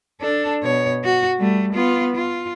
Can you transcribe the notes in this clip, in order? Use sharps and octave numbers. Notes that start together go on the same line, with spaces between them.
D4 A4
B2 C#5
F#4
G3 A3
B3 F4
F4